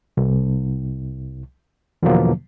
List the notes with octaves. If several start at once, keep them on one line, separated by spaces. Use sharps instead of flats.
C2
E2 B2 D3 F3 F#3 A#3